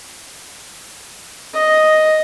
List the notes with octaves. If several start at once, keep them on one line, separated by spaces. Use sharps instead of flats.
D#5